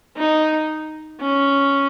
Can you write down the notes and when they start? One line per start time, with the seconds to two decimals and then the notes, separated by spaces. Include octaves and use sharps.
0.17 D#4
1.20 C#4